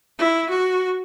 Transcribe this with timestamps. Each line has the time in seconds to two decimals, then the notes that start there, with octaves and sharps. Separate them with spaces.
0.19 E4
0.50 F#4